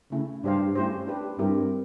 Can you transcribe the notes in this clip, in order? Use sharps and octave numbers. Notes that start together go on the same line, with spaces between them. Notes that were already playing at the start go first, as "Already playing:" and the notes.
C#3 A3 C#4 E4
G2 D4 G4 C5 F5
A3 C#4 E4 G4 C5
D4 G4 B4
G2 C4 E4 G4 A#4